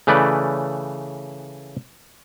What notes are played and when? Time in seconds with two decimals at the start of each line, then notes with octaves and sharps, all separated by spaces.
0.07 C#3 E3 A3 B4 D5